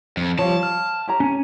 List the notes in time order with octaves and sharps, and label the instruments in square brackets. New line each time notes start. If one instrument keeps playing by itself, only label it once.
[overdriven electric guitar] F2
[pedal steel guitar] F3 G3 [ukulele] C#5 F5 [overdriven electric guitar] A5
[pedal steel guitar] F6
[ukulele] G4 C#5 A#5
[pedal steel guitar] C#4 G#5